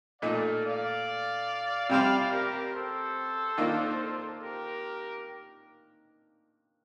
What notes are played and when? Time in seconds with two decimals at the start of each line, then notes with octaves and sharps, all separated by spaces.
0.21 A#2 A3 D#4 D5 F5
0.64 D5 F5
1.90 C3 G3 C4 D5 F5
2.31 G4 A#4
2.74 A4 C5
3.58 D#3 A#3 D4 F4
4.41 G4 A#4